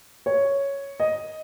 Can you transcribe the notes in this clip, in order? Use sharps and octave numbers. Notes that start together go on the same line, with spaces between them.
C#5
D#5